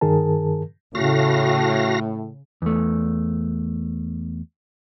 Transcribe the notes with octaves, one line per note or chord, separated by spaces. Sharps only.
G2 D#3 G#4 A#4 A5
A2 C#3 F#4 F5 A#6
E2 A3